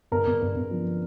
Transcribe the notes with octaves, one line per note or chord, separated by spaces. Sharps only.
G1 A#4
G1
G1
G1
F3